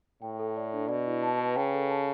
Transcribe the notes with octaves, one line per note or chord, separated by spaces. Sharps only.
A2 G5
A4
D5
D4
B2 D5
E4
A5
B4
C#3 G5
A4
A5